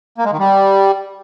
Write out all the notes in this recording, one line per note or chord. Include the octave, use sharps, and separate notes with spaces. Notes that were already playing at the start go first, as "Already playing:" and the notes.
A#3
G#3
D#3
G3